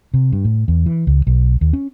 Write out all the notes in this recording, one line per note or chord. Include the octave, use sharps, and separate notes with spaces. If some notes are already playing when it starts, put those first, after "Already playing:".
C3
G2
A2
E2
E3
C#2
B1
D#2
C#4